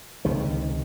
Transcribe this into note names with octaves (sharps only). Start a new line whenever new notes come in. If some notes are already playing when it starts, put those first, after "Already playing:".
C#2 C3 D#3